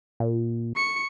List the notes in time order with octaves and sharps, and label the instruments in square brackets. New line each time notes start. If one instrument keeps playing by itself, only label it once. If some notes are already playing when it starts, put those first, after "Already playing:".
[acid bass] A#2
[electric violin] C#6 C#7